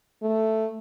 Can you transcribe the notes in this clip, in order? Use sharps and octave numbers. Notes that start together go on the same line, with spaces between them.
A3